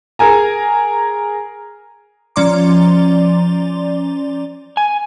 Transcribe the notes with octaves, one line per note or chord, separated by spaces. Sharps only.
G#4 A#4 G#5 A#5
F3 C#4 D5 A#5 C6 D6
G#5